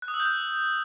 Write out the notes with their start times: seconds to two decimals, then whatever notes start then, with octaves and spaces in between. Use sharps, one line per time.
0.02 F#6
0.08 D#6
0.14 E6
0.20 G6
0.26 F#6